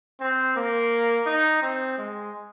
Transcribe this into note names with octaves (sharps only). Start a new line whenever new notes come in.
C4
A#3
D#4
C4
G#3